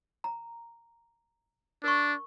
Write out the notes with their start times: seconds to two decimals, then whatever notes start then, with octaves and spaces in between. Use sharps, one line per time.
0.24 A#5
1.84 D4 A#4 C#6